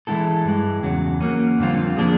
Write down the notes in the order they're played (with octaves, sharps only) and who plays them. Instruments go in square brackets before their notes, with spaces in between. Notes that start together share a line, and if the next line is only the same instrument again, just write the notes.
[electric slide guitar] E3 G#3 B3 E4 A4
G2 E3 G#3
E2 C#3 F#3
F#3 A#3 C#4
F2 D3 G3 C4 F4
F3 A#3 D4 F4 G#4